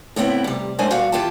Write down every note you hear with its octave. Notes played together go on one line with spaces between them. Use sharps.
A2 C#3 B3 C4 E4
C3 G3
F#2 A2 G#3 D4 C5 G#5
A#2 G3 F#4 F5
D#2 E3 F4 G4 G5 A5